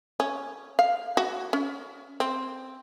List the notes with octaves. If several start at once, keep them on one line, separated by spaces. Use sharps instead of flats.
C#4
F5
F#4
C#4
C4